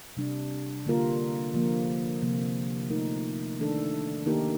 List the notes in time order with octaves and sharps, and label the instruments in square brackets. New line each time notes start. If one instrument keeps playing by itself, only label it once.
[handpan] C3 G3 D4
D3 G3 A#3 F4 A#4
D3 F3 A#3
C3 F3 A#3
A3 D#4 A#4
D#3 A3 D4 A4
D#3 A#3 D#4 G4 A#4